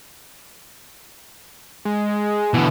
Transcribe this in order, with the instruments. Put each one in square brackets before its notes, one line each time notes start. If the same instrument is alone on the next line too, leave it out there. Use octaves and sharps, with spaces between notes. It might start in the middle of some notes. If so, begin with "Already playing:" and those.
[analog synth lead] G#3
[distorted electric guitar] B2 D3 [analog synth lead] E3